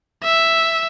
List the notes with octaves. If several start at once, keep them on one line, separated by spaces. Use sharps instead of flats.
E5